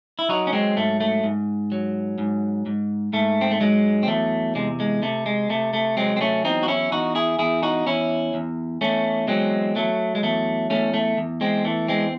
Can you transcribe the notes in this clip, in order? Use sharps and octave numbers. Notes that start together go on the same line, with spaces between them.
E4
F#3 D#4 F#4
C#4
G#3 C4
G#2 A3
A3
G#2
F#3
G#2
G#2
G#2 A3
C4
A3
F#3 G#3
C4
E2 A3
C3 G#3
G#3
C3 A3
G#3
C3 A3
A3
F#3 G#3 C4
C4
A3 C#4
E2 C4 D#4
F#4
C#4 E4
E2 D#4 F#4
E4 G#4
E2 E4 G#4
D#4 F#4
E2 C#4 E4
E2
E2 A3 C#4
F#3 G#3 C4
F#3 A3
G#3
E2 A3
E2 A3 C#4
A3
E2
G#3 C4
E3 A3
G#3 C4